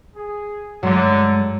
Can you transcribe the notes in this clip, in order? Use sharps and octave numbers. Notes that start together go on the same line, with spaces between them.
G#4
G2 D3 F#3 G#3 A3